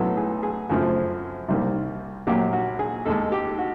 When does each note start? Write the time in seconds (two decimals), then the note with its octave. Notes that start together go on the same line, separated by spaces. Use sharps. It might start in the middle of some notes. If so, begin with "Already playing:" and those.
Already playing: B1 A2 F#3 B3 A4
0.17 G#4
0.43 G#4
0.69 F#2 C#3 F3 A3 C4
1.48 C2 C3 D#3 G3 A#3
2.27 A#1 A#2 F#3 A#3 G4
2.53 F#4
2.79 G#4
3.05 D#2 D#3 G#3 A4
3.32 G4
3.58 F#4